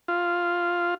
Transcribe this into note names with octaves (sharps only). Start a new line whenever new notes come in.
F4